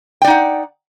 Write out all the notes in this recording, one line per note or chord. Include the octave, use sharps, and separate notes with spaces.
D#4 D5 F#5 G5